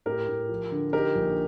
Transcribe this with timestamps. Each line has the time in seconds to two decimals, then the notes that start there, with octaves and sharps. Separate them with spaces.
0.06 A2 G4 A#4
0.28 A2
0.49 F3
0.71 D3
0.93 D#4 G4 A#4
1.15 A#1